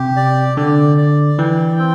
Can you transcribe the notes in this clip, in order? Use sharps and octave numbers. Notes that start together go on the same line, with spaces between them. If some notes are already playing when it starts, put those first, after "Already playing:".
Already playing: C3 G4
D5
D3 D5
D5
E3 G5
C4